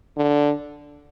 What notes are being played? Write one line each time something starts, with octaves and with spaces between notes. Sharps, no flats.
D3